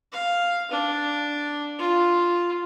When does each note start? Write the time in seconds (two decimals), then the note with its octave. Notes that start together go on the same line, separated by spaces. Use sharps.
0.12 F5
0.71 D4
1.79 F4